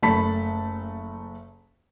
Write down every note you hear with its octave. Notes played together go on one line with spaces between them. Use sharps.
F#1 A3 A5 B5 B6